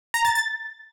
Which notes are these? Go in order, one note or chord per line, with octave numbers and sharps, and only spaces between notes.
A#5
A6
A6